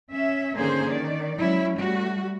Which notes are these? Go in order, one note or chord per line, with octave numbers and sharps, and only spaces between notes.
C#4 E5
D3 D#3 A#3 C#4 G#4 C5
D#3 D5
F#3 G#3 C#4 E4
G3 A3 F#4